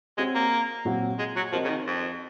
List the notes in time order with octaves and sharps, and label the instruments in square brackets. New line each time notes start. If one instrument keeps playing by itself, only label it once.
[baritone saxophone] G#3 [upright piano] C4 F#4 C#5
[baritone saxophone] A#3
[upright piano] A#2 F#3 C4 F#4
[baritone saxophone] G#3
F#3
[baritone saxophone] F3 [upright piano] C4 F#4 A#4 D#5
[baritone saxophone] C#3
D#3
F2